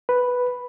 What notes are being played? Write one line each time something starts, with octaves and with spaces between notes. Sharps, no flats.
B4